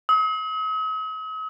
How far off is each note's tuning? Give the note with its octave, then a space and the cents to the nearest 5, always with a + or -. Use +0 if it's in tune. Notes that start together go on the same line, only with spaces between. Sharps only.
D#6 +45